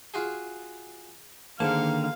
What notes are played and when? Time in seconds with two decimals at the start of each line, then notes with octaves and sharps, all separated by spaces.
0.14 F4 F#4 G#4
1.60 G#2 D3 D#3 A#3 F5 A5